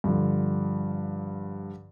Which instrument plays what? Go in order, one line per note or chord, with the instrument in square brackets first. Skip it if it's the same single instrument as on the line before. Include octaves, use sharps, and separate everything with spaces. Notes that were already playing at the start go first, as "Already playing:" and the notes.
[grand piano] G2 D3 F3